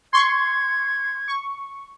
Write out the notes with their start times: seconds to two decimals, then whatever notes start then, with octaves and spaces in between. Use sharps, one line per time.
0.13 C6 C#6 G#6
1.28 C#6